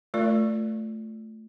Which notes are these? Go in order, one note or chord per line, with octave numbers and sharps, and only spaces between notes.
A3 F4 A#4 D5